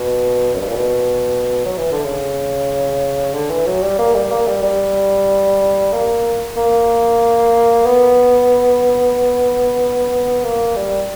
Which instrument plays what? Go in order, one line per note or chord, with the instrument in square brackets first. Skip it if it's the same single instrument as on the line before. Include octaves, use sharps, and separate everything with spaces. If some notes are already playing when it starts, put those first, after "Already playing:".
Already playing: [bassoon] B2
F#2
G2
A#2
B2
F#3
E3
D3
C#3
D3
E3
F#3
G3
A#3
G3
A#3
G3
G3
A#3
A#3
B3
A#3
G3